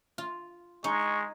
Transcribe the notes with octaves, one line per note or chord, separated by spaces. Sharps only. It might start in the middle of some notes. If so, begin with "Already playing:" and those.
F4
G#3 D#4 C#6